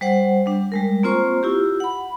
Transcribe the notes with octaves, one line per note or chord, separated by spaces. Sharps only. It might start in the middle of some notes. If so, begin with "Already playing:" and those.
G3 C5 F#5
G3 D4
G3 G#3 A#4
A#3 C4 F4 C5 A#5 C#6
E4 F4 G4
F#5 B5